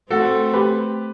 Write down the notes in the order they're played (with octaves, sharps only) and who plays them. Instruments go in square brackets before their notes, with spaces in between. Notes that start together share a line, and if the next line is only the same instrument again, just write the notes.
[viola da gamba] A3 C4 [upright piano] F#4 A4
[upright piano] G4 B4